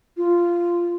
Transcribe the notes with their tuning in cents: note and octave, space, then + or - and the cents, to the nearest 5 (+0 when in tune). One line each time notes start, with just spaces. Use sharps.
F4 -10